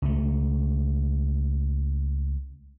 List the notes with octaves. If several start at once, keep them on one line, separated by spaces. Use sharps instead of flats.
C#2 A3